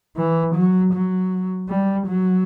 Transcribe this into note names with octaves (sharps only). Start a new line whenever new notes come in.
E3
F#3
F#3
G3
F#3